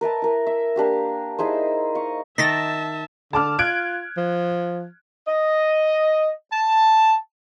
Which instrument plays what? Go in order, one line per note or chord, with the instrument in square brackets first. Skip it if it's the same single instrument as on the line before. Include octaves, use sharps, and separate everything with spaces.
[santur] A#4 B4 E5 A5
E4 A#4
E5
A#3 D4 G4 F5
D#4 E4 G#4 C5
D#5 F5 C#6
[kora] D#3 D#4 [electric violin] E5 A5 [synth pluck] A6 A#6
[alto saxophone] D3 [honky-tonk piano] A5 D6 F6
[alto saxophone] F4 [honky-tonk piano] F#6 G#6 D7
[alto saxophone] F3
[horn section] D#5
A5